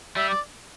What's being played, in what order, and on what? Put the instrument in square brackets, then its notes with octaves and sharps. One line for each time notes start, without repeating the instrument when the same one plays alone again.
[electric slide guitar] G3 [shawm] E5
[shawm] D5